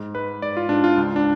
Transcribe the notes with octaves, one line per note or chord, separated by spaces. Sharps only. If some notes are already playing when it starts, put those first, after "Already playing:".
Already playing: G#2
G#2 B4
G#2 D5
F4
G#2 D4
F4
C#2
D4